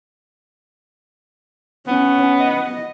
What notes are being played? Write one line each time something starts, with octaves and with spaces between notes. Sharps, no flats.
B3 C#4
D#5